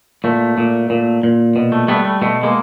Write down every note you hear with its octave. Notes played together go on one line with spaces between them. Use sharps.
A#2 A3
A#2
A#2
A#2
B2
A3
G3 A3 B3
A3
B2 A3
G#3 A#3